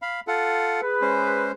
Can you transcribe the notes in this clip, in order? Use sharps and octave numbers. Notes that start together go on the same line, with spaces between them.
F5 B5
F4 A4 F#5
G#4 B4
G#3 C#4 C5